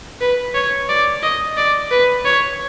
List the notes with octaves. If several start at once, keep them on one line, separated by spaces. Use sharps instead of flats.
B4
C#5
D5
D#5
D5
B4
C#5